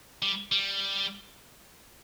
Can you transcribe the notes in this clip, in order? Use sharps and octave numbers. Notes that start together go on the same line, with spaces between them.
G3
G3